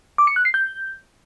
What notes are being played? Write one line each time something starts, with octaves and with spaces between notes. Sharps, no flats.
D6
C#7
F#6
C7
G6